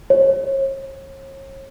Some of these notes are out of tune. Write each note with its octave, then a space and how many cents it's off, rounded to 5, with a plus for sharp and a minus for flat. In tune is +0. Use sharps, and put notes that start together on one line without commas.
C#5 -40